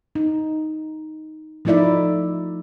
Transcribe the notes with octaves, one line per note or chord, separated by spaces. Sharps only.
D#4
F3 A3 D#4 E4 D5 E5